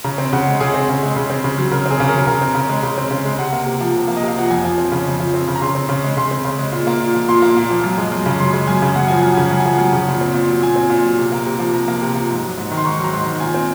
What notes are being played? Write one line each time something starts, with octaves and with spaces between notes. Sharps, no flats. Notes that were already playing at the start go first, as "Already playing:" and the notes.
C#3 A#5
C4
C#3 F#5
G#3
C#3 G#4
C4
C#3
G#3
C#3
C4
C#3
F#3
C#3 A#4
C4 G#4
C#3
A#4
F#3
C#3 A#4
C4
C#3
G#3
C#3
C4
C#3
G#3
C3 F#5
A#3
C3
F3
C3
A#3
D#5
C3
F5
F3 F#5
F2 G#5
F3
C4
C#3
F2
F3
C4
C#3
A#5
C#3 C6
C4
C#3
G#3
C#3 C6
C4
C#3
G#3
A#2
A#3
A#2
F3
A#2 C6
A#3
A#2
F3
F#2
G#3
F#2
C#3
F#2 C6
G#3
F#2 G#5
C#3
F#2 F#5
F3 G#5
F#2 F#5
C#3 G#5
F#2 F#5
G#5
F3
F#5
F#2
C#3
A#2
C4
A#2
F#3
A#2 G#5
C4
A#2
F#3
C3
A#3
C3
F3
C3 A#5
A#3
C3
F3
G#2
F#3
G#2
D#3
C6
G#2 C#6
F#3 A#5
G#2 C6
D#3
A#2 G#5
C4